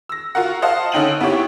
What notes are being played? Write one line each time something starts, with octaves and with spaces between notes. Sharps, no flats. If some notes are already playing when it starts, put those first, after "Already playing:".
E6 A#6
F4 F#4 A#4 F#5
C5 D#5 F5 F#5 A5
D3 C#4 D#4 G5 D#7 F#7
B3 C4 E4 G4 C#5